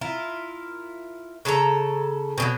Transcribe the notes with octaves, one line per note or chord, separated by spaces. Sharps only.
E4 F4 A#4
C#3 A4 A#4 A#5
B2 D3 F#3